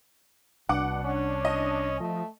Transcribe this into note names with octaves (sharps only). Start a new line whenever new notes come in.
C2 B2 D4 F#5 D6
C#4
D#5
F3 A3